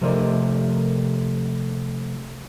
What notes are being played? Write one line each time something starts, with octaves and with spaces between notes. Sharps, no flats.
C3 F3 A3 A#4 D5 D#5